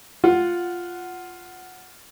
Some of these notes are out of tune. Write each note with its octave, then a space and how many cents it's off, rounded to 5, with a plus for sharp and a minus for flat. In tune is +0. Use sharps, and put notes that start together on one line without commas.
F4 +0 F#5 +0